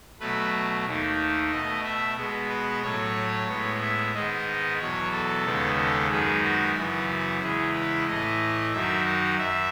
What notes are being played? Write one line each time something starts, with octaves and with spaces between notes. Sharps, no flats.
B2 F#3 A3 B4
D#2 D#3 A3
B2 A3 D#5
E5
B2 G#3 B3
B4
A2 F#3 A3 C#5
A2 G#3 B3
E5
G#2 D#3 G#3 B3 D#5
E2 B2 F#3 C#5
A4
D#2 C#3 G#3 B3
A4
F#2 D#3 G#3 B3 G#4
F#4
F#2 C#3 E3 B3 F#4
F#4
E2 C#3 E3 G#3 G#4
B4
A2 E3 A3 D#5
F#2 D#3 F#3 E5
F#5
F#2 E5